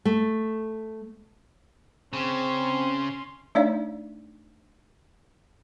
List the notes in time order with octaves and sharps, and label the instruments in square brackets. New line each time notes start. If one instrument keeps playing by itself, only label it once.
[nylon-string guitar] A3
[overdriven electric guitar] C#3 [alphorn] C4 [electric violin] C#4 C6
[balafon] A3 D4 D#4 C#5 D5 F5